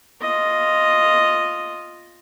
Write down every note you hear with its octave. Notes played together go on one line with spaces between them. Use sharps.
F4 D#5